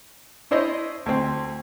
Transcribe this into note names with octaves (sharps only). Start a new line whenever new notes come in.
D4 E4 C5 C#5 D#5
D2 C4